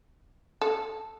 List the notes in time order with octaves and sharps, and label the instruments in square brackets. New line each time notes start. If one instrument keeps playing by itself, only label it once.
[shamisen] A4